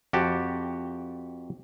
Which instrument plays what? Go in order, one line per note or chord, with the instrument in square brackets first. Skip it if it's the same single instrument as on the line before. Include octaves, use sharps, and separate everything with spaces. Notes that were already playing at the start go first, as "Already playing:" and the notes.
[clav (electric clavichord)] F2 F#4 G4 A5